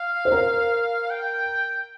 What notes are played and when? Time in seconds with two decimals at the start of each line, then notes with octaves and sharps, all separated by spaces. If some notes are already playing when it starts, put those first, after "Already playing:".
Already playing: F5
0.25 C5
0.32 A#4
1.11 G5